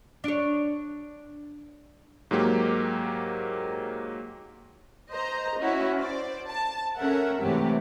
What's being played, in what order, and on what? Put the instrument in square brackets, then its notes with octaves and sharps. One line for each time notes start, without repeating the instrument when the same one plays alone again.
[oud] D4 C#5
[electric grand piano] G#2 F#3 A#3 G4
[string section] C5 D#5 A#5
C#4 E4 F#4
C5 D5
A5
C#4 A4 A#4 E5 F#5
G#2 C3 E3 F#3 A3 G4